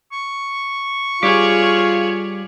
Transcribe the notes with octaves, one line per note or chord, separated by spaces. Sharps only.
C#6
G3 F4 G#4 C#5 D6 B6